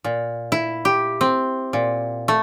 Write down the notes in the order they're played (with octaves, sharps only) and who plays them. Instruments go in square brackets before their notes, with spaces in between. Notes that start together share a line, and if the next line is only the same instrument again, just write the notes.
[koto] A#2
E4
G4
C4
A#2
A3